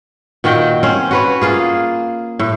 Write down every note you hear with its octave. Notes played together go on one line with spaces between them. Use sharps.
A#2 D#3 F#4 G5
C4 C#4 C5
F#4 B4 C#5
A#3 F4 G#4
A2